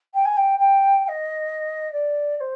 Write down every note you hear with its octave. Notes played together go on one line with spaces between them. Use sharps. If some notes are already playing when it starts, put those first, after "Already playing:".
G5
G#5
G5
G5
G5
D#5
D5
D5
C5